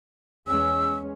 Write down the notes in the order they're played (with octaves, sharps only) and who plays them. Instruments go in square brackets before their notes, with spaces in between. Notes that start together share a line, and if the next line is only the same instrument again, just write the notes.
[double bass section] E2 G#3 C#4 [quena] E6